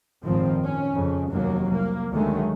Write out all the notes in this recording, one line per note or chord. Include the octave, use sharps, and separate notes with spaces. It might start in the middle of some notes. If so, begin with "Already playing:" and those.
G#1 F#2 A#2 D#3 F3 C4
C#4
F2 C#3
F1 D#2 F#3 A#3
C2 A#3
D2 D3 D#3 F#3 G#3 A3